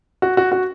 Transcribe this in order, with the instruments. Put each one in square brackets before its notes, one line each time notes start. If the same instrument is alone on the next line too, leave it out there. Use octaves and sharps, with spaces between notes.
[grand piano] F#4
F#4
F#4